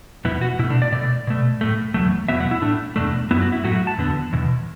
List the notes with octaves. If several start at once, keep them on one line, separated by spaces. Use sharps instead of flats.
E2 B2 B3 E4
F#4
B2 A3 E4
D4
D5
B2 A3 D5
B2 A3
A2 A3
E2 B2 F#3 A3
E2 B2 F#3 B3 E5
F#5
E4
A2 A3 D4
E2 B2 A3 D4
F#2 F#3 B3 E4
F#4
E4
A2 F#3 A3 F#4
F#4
A5
E2 D3 B3
E2 B2